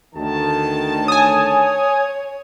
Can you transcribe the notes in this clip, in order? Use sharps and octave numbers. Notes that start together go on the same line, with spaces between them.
D2 D#3 A5
C#5 G#5 D#6